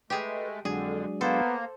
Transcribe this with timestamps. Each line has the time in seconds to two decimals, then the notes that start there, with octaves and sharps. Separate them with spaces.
0.10 G#3 A3 G4 G#4 B4
0.65 F2 D3 F#3 G#3 D4 G#4
1.21 A#3 B3 A4 C5